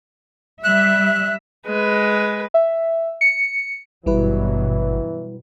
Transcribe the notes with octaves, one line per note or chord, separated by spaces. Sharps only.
G3 E5 F#6
G#3 B4
E5
C#7
G#1 G2 B2 E3 F#3 G3 E4 B4